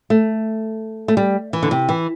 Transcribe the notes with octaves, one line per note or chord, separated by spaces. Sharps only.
A3
A3
G3
E3
D3
C3
E3